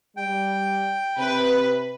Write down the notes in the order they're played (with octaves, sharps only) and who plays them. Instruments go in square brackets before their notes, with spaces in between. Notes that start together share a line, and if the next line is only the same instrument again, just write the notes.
[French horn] G3 [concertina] G5
[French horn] C3 [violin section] B4